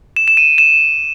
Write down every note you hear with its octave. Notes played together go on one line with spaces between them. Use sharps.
E7
E7
D#7
E7